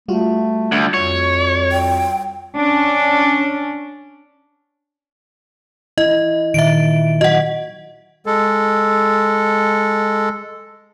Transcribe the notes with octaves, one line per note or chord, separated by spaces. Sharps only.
G3 A3 F4 F#4
D2
F2 C#5
G5
C#4 D4
E4 D#5
A#2 D#3 E5 D7
F#3 F#4 D#5 F#5
G#3 A4